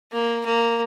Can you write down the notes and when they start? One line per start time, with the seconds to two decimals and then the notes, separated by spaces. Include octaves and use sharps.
0.12 A#3
0.46 A#3